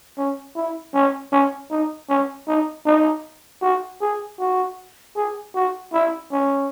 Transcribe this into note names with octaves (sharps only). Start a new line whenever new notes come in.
C#4
E4
C#4
C#4
D#4
C#4
D#4
D#4
F#4
G#4
F#4
G#4
F#4
E4
C#4